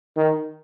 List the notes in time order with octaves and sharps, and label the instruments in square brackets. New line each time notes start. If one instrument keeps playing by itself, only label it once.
[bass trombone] D#3